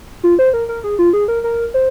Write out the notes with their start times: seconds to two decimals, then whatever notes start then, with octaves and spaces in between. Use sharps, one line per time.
0.23 F4
0.39 C5
0.54 A#4
0.69 A#4
0.84 G#4
0.99 F4
1.13 G#4
1.28 A#4
1.44 A#4
1.74 C5